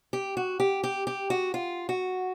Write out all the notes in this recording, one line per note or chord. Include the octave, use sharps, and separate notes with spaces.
G4
F#4
G4
G4
G4
F#4
F4
F#4